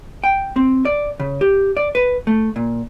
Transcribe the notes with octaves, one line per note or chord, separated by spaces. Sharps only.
G5
C4
D5
C#3
G4
D5
B4
A3
A#2